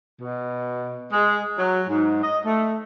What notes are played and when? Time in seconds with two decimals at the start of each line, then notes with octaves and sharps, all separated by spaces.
0.21 B2
1.13 G#3
1.58 F#3
1.90 G#2
2.23 D#5
2.46 A3